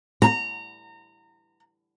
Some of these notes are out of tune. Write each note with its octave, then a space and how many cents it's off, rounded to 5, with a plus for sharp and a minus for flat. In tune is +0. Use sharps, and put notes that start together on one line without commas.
A#5 -25